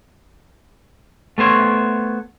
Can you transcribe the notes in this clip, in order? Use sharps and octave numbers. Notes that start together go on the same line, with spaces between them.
A3 B3 C5 C#5